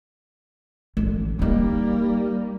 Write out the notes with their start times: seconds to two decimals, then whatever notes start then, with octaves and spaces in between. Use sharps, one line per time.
0.97 A1
1.39 G3 A#3 D#4 E4